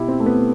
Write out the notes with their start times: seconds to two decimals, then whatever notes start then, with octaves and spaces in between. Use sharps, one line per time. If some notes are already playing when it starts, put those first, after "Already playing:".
Already playing: B2 E4 G4
0.08 C4
0.20 A3
0.26 B3